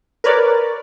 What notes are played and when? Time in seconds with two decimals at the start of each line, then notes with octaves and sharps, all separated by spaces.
0.24 A#4 B4 C#5 D5